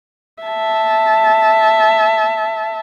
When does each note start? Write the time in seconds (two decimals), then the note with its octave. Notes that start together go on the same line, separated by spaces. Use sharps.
0.44 E5 A5